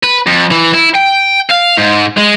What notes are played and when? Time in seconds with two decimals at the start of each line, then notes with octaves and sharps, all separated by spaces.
0.03 B4
0.26 F2
0.51 E3
0.74 E4
0.95 G5
1.50 F5
1.77 G#2
2.17 G#3